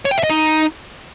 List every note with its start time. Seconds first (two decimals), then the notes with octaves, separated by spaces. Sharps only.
0.05 C#5
0.11 G5
0.17 E5
0.23 D#5
0.30 D#4